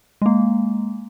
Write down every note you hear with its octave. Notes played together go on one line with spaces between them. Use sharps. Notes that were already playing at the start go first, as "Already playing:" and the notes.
G#3 A#3